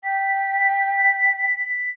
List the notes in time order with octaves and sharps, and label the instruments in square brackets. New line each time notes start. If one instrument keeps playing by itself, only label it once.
[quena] G5 [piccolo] B6